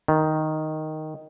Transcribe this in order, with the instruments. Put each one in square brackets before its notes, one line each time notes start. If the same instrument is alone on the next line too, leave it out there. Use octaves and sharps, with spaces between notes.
[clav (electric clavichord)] D#3